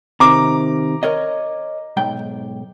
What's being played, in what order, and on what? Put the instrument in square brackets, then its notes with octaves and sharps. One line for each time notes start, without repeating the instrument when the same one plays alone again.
[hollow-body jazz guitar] C3 D#3 [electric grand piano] A#5 D6
[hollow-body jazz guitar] A#4 C#5 D#5
B1 G#2 G5